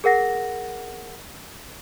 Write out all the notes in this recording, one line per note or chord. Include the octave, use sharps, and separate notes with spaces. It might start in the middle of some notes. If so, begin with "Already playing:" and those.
G#4 A#4 F#5 A#6